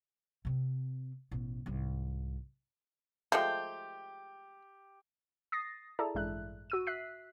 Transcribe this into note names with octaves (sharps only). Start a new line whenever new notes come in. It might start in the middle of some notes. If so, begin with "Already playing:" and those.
C3 C4
A1 B2
C2 G#2
F3 G#3 A3 G4 G5 C6
D#6 A6 A#6 C7
E4 G#4 A4 D5 A5 A#5
A1 G2 G#3 E5 F#6
F#4 E6 D#7
E5 F#6 B6 C7